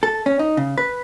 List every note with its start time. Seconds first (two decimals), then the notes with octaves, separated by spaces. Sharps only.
0.03 A4
0.26 C#4
0.39 D#4
0.57 C#3
0.78 B4